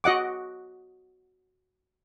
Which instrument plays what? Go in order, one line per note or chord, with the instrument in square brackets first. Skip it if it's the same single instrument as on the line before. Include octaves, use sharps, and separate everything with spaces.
[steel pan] F#4 D#5 F#5 D6